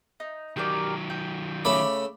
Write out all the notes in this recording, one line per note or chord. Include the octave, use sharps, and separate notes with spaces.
D#4
D#3 F#3 G4 A#4 D5
G5
C#3 A3 B5 D6